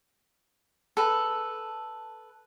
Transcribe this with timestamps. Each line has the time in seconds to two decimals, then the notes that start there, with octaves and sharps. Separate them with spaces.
0.97 A4 B4